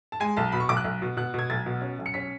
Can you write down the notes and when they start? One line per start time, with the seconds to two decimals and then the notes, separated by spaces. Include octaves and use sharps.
0.12 A5
0.20 G#3 G#5
0.37 B1 A5
0.52 B2 B5
0.60 C#6
0.69 B1 D6
0.77 F#6
0.84 B1
1.02 B2
1.17 B2 F#6
1.34 B2 G#6
1.50 B1 A6
1.66 B2
1.82 C#4
1.99 B1
2.06 C#7
2.14 C#4 B6